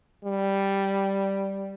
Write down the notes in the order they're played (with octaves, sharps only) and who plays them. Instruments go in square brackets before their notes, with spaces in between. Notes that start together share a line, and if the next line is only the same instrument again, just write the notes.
[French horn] G3